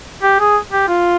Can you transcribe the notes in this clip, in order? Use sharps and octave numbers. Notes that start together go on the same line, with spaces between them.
G4
G#4
G4
F4